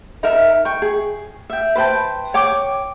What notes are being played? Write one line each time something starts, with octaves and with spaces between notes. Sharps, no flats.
D#4 A#4 E5
G5 C#6
G#4
E5 G5
B4 C5 G5 A5
C#5 G5 D6